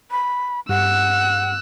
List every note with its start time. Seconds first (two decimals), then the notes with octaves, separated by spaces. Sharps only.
0.11 B5
0.69 G2 F#5 E6 F#6